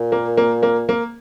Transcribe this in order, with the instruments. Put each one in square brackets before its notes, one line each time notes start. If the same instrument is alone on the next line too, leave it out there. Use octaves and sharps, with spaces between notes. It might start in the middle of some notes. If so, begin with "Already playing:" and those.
Already playing: [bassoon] A#2
[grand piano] A#3
A#3
A#3
A#3